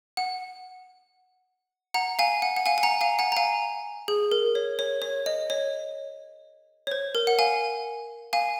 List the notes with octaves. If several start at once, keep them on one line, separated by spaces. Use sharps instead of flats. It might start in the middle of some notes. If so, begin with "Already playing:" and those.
F#5
F#5 A#5
F5 G#5
F#5
F#5
F5 G#5
G#5
F#5 A#5
F5 G#5
F#5 A#5
A#5
F5 G#5
G#4
A#4
C#5
C#5
C#5
D#5
C#5
C#5
C5
A#4
F#5
F5 G#5
F5 G#5